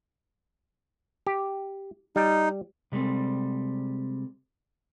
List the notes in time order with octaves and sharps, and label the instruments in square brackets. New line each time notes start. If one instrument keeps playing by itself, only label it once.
[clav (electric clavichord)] G4
[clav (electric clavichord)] G3 [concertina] D#4
[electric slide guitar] C3 G3 G#3 C4 A4